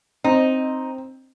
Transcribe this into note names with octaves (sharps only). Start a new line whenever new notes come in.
C4 D#4